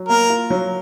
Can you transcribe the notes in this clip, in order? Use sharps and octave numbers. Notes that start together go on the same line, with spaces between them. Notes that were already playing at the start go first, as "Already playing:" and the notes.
Already playing: F#3
A#3 A#4
F4
F#3